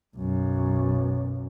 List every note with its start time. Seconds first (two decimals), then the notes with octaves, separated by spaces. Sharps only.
0.16 B1 F#2